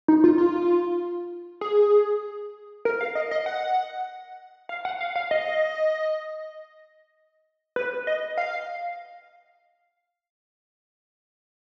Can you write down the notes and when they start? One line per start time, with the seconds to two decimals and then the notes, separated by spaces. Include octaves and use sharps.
0.08 D#4
0.24 F4
0.38 F4
1.61 G#4
2.85 A#4
3.01 F5
3.15 D#5
3.31 D#5
3.46 F#5
4.69 F5
4.85 F#5
5.01 F5
5.16 F5
5.31 D#5
7.76 B4
8.07 D#5
8.38 F5